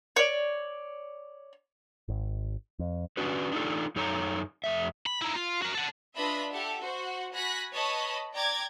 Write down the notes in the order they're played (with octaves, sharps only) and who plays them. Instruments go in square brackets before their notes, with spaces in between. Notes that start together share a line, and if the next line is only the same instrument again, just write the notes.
[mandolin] C#5 D5
[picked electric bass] G#1
F2
[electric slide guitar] C#4 D4 F#4 B4
D4 D#4 F4 A4
F#2 D#4 A4 C#5 G#5 A#5
F2 A3 E5
[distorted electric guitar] B5
D#4 E4
F4
F#4 A#4
A4 F#5
[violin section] D4 F4 B4 D#5 E5 B5
G4 A4 E5 F#5
F#4 C5 F#5
F#4 G#5 B5 F#6 A#6 B6
B4 C#5 D#5 A5 B5
D5 G5 A#5 D6 G#6 A6